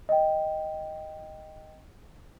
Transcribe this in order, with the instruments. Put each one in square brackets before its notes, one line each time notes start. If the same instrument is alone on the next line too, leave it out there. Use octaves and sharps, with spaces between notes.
[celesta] D#5 G5